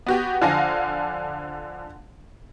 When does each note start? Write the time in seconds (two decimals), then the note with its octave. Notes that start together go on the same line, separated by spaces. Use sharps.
0.07 B3 F#4 G4
0.42 D3 F3 D4 F5 G#5 A#6